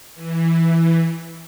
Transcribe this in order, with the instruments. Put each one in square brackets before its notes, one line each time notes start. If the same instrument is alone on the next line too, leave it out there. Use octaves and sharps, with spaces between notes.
[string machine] E3